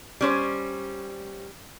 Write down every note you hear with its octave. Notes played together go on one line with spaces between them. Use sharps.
G3 C#4 C5